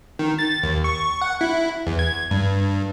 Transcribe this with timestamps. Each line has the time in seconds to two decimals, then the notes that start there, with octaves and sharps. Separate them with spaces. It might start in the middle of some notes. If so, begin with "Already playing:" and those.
0.19 D#3
0.39 A6
0.63 D#2
0.84 C#6
1.21 F#5
1.41 E4
1.87 E2
1.99 G#6
2.31 G2